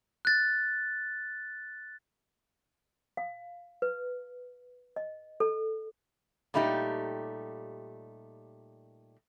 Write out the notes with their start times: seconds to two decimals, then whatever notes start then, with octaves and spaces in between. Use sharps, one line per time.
0.25 F#6 A6
3.17 F5
3.82 B4
4.96 D#5
5.40 A4
6.54 A#2 G3 A3 D#4 G4